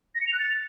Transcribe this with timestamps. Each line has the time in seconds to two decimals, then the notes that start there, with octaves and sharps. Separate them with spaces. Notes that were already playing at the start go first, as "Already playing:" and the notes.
0.15 A#6
0.21 C#7
0.27 F7
0.33 F#6
0.39 A6